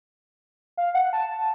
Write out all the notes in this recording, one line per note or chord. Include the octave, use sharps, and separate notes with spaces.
F5
F#5
A5
A5